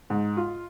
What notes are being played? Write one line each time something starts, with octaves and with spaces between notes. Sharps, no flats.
G#2
F4